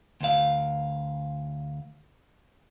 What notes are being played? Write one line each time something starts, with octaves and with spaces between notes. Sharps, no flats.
D2 F5